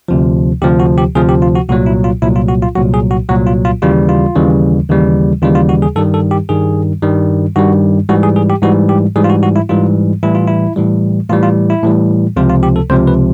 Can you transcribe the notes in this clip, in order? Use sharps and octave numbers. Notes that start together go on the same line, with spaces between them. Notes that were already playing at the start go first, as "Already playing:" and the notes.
D2 C3 F3
D2 C3 F3 G4
F#4
G4
D2 C3 F3 G#4
G4
F4
F#4
C2 A#2 F#3 F#4
E4
F4
C2 A#2 F#3 E4
F4
F#4
F4
C2 A#2 F#3 F#4
G#4
F#4
C2 A#2 F#3 F#4
F4
F4
D#2 C#3 E3 G3 F4
F4
D#2 C#3 E3 G3
D#2 C#3 E3 G3
D#2 C#3 E3 G3 F4
F4
F#4
G#4
G2 D#3 G3 A4
A4
G4
G2 D#3 G3 G#4
G2 D#3 G3
G2 D#3 G3 F#4
G#2 E3 G3 F#4
G#4
G#4
G4
G#2 E3 G3 F#4
G4
G#2 E3 G3 G#4
F4
F#4
F#4
E4
G#2 E3 G3 F4
A2 E3 G3 E4
F4
E4
A2 E3 G3
A2 E3 G3 F4
F4
E4
A2 E3 G3
C#2 C3 F3 F4
F4
G4
A4
C#2 C3 F3 C5
B4